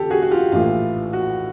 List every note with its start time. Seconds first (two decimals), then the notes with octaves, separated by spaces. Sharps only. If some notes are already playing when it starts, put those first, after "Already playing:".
Already playing: D#2 C#3 F3 G4 A4
0.10 F#4 G#4
0.22 F#4
0.31 F4 G4
0.52 A#1 A2 E3 F4
1.13 F#4